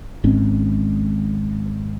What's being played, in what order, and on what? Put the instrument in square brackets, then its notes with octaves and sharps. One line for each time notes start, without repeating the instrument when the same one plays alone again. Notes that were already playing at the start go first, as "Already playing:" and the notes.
[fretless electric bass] G#1 G#2 C4 C#4